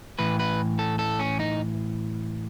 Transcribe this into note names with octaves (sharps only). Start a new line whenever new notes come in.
A2 E3 B4
B4
A4
A4
C#4
D#4